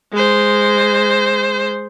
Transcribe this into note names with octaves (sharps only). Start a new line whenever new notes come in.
G#3 C5